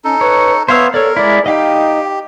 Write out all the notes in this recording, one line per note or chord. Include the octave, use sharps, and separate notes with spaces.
C#4 D#4 A4
B4 C#5
B3 C5 C#5 E5 F5 E6
A4 A#4 C#5 D5
G#3 E4 D5
D#4 G4 D#5 F5 G5